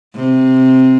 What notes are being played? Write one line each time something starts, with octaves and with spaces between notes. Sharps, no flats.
C3